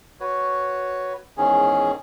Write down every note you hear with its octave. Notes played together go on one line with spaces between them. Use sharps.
F#4 B4 C#5
E2 G#2 D#3 C#4 G#4